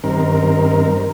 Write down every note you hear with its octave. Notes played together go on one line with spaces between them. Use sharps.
G2 D#3 C4 A#4